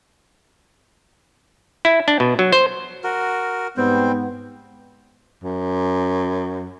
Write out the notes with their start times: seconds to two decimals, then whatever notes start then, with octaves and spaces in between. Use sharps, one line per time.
1.85 E4
2.08 D4
2.20 B2
2.39 F#3
2.52 C5
3.04 F#4 A#4
3.77 G#2 G3 B3 C4 C5
5.44 F#2